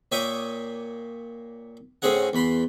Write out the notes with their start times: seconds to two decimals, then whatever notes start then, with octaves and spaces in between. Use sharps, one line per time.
0.12 A#2 C#5 E5 G5 D6 D#6
2.02 A2 C4 C#4 G#4 F#5
2.33 E2 B5 C6